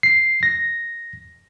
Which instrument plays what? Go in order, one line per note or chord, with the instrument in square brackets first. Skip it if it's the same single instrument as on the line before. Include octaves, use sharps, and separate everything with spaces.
[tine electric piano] C7
A#6